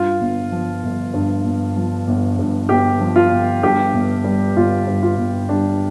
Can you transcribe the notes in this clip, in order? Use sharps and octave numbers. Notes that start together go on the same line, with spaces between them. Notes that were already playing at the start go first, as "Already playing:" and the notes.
Already playing: G2 F4
G1
F3
G1
G2
G1
F3
G1
G2
G1 G4
F3
F4
G1
G2 G4
G1
G3
G1 F4
G2
F4
G1
G3 D4